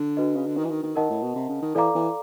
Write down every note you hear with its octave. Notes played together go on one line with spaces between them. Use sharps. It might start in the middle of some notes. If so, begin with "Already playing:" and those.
Already playing: D3
D4 F#4 B4 D#5
C#3
D3
D#3
E3
D#3
D#3
D#3 A#4 D#5 F#5 A5
A2
B2
C3
C#3
D#3
E3 A4 D5 F5 A#5 D6
E3